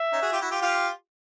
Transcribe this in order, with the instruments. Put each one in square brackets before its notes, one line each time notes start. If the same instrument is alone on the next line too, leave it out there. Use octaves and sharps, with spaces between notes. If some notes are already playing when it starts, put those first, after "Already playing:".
Already playing: [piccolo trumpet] E5
[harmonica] C#4 D#4
F#4 G#4
F4 G4
E4 F#4
F4 G4
[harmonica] F4 G4 [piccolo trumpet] F5